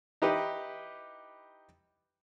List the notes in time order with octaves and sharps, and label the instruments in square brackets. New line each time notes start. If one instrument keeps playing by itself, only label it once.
[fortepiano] D#4 E4 G4 B4